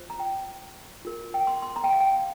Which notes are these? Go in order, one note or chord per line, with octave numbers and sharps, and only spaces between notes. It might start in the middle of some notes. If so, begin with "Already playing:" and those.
Already playing: F4 C5
A#5
G5
F4 A#4
G5
C6
C6
A#5
G5
F5
G5